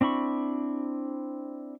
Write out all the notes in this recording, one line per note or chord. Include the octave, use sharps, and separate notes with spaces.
C4 D4 E4 B5 C#6